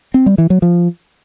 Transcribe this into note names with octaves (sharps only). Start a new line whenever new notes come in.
C4
G3
E3
F#3
F3